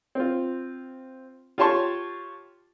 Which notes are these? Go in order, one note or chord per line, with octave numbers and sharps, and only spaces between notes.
C4 F4
F4 G4 C#5 A5 C6 C#6